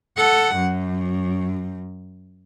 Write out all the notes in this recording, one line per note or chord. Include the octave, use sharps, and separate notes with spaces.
A4 F#5
F#2